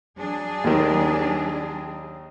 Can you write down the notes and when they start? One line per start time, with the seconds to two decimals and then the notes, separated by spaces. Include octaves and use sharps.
0.18 F#3 D4 G#4
0.64 D#2 D#3